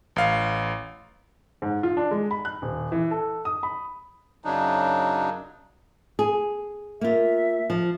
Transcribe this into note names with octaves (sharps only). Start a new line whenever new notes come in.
A1 F5
G#2
F4
D4
G#3
B5
F#6
D#1
E3
A4
D#6
B5
F#2 C#3 F#3 D4 D#4
G#4
A#3 F4 E5
F3